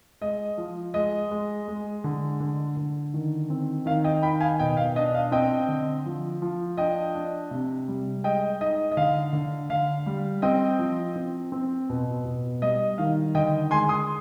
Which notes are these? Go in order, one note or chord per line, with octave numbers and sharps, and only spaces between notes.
G#3 D#5
F3
G#3 D#5
G#3
G#3
D3
D3
D3
D#3
C4
D#3 F5
D#5 G5
D#4 G5 B5
F5 G#5
B2 D#5 G5
F5
D4 D#5
F5
C4 D#5 G5
D3
F3
F3
D4 D#5 G5
D4
C3
G3
G#3 D#5 G5
D#4 D#5
D#5
D3 F5
D3
D3 F5
G3
C4 D#5 G5
F3
C4
C4
B2
B2
G3 D#5
D#3 F5
D3 D#5 G5
G#3 G#5 C6
C6 D#6